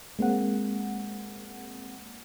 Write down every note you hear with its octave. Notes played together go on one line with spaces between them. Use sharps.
G#3 A#3 C4 F#5